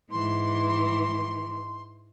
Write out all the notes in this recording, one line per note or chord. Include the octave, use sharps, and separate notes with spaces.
G#2 E3 C6